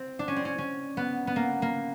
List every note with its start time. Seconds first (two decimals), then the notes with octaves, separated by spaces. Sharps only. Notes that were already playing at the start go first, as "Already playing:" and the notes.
Already playing: C4
0.19 D4
0.28 C#4
0.36 C4
0.45 C#4
0.58 C#4
0.97 B3
1.27 B3
1.36 A#3
1.62 A#3